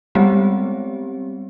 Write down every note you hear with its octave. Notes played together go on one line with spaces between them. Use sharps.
G3 G#3 B3 C4 G4